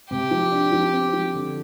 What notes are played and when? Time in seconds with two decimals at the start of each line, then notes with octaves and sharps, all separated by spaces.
0.10 C3 G4
0.31 F3
0.52 D4
0.72 F3
0.93 C4
1.13 F3
1.34 D3